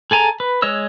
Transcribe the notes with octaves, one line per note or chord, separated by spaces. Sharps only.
G#4 A4 G#5 A#5
B4
G#3 C#5 D#5 E6